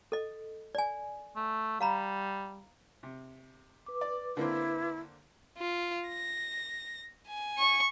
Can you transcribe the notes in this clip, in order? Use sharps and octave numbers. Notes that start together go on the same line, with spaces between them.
A4 D#5
D5 G#5
A3
G3 F5 A#5 B5
C3
B4 D6
D5
D3 A#3 C4 E4
F4
A#6
G#5
C#6